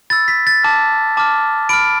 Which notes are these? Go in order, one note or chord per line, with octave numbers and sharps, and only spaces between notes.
B5 E6 A6
B6
A6
A5 D6 F6
A5 D6 F6
B5 F6 D7